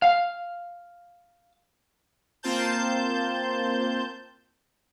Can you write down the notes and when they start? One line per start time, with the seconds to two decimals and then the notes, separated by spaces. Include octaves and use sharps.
0.02 F5
2.43 A#3 C4 F4 C5 A5 G6